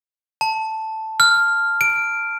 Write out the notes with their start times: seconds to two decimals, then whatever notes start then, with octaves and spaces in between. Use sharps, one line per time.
0.41 A5
1.20 F6
1.81 D7